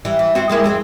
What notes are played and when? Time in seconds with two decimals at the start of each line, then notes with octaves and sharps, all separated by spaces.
0.05 E3 G3
0.19 E3
0.35 C4 E4 F#4
0.49 G#3 A#3 E4
0.64 F2 C4 G#4